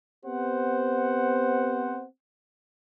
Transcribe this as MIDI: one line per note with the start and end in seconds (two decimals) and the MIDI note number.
0.24 2.05 59
0.24 2.05 60
0.24 2.05 67
0.24 2.05 72
0.24 2.05 78